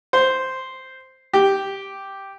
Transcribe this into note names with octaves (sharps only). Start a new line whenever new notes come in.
C5
G4